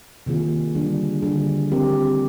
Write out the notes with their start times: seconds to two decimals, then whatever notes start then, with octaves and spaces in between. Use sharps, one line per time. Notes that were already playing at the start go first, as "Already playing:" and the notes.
0.26 C3 D#3 A#3 F4 G#4
0.74 D3 G3 D4 G#4
1.22 D3 G3 D4 G#4
1.70 D3 F3 C4 G4 A#4